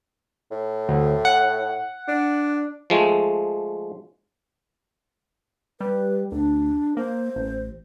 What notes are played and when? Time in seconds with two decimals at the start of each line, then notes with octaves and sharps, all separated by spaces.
0.51 A2
0.89 D2
1.25 F#5
2.08 D4
2.90 F3 G#3 A3
5.81 G3 B4
6.32 D2 D4
6.97 A#3 C5
7.36 A1